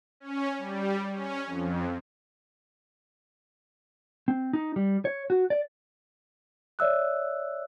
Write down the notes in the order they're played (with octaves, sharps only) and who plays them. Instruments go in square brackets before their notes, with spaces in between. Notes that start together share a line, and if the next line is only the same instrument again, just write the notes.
[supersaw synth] C#4
G3
C#4
F2
[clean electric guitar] C4
D#4
G3
C#5
F#4
D5
[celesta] C#5 D5 E5 E6 F#6